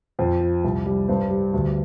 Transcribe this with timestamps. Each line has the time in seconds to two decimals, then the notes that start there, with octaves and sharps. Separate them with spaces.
0.19 F2 C5
0.41 F3
0.64 C2
0.86 G3
1.08 G2 C5
1.30 G3
1.54 D2